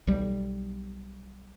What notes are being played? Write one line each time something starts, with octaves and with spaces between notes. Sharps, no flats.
B1 G3